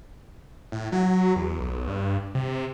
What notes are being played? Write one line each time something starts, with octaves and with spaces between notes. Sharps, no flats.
A2
F#3
E2
B1
G2
C3